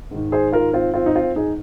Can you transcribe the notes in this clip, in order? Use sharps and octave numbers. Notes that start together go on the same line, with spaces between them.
G#2 D#3
G#4 C5
F4 A#4
C4 F4
C4 F4
D#4
C4 F4
D#4 G#4